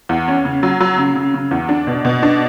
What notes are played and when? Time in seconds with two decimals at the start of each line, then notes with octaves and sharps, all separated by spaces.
0.09 E2
0.28 C#4
0.45 C#3
0.63 F#3
0.80 F#3
0.98 C#3
1.15 C#3
1.34 C#3
1.51 E2
1.69 D4
1.87 B2
2.05 B2
2.23 D4